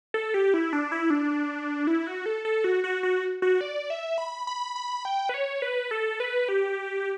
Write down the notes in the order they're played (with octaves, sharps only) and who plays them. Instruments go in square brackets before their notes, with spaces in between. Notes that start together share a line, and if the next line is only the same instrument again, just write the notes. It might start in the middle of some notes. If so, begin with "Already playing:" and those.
[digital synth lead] A4
G4
E4
D4
E4
D4
E4
F#4
A4
A4
F#4
F#4
F#4
F#4
D5
E5
B5
B5
B5
G5
B4
C#5
B4
A4
B4
G4